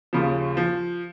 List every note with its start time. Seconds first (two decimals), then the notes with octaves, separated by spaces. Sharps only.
0.13 D#2 C#3 F3
0.57 F3